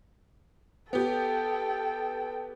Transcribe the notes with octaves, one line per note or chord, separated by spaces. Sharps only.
B3 G4 A4 G5